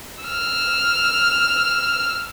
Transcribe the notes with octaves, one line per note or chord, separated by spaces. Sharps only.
E6 F6